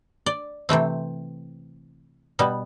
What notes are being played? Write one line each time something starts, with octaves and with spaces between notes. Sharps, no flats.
D5
C3 E3 A3 C4
B2 G3 B3